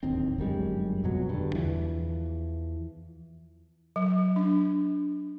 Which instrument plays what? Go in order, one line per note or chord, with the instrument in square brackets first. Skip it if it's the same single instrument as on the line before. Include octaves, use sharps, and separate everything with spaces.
[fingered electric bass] D1 D#2 D#3 C4
G1 F#2 G3 G#3
F2 B2 F#3
G2 D3
E2 E3 F3
[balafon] F#3
D4